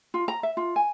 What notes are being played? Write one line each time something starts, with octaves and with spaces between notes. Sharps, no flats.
F4
A#5
E5
F4
G#5